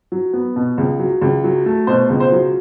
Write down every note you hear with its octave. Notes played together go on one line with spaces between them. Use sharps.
F#3
B3
B2
C#2
F#3
C#2
F#3
A3
B2 C5
C#2
C5
F#3